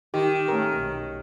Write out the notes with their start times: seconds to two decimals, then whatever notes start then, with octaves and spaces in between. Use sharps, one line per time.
0.14 D#3 G4
0.48 A3 C#4 A#4
0.77 B1